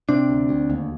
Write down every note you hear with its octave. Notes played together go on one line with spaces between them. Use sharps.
C3 C4 D4
D2
D2
D#2